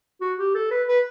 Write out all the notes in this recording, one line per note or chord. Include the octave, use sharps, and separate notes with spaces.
F#4
G4
A4
B4
B4